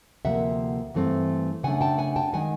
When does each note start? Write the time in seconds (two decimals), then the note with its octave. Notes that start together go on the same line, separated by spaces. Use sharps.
0.24 D2 C3 F3 A#3 E5 F#5
0.94 G2 E3 A3 C4
1.63 C#3 F#3 A3 D4 F#5 G#5
1.81 G5 A5
1.98 F#5 G#5
2.16 G5 A5
2.33 D#3 G#3 F#5 G#5